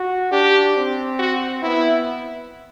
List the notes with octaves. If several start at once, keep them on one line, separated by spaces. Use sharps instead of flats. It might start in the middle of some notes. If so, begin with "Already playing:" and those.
Already playing: F#4
D4 G4
C4
F#4
B3 E4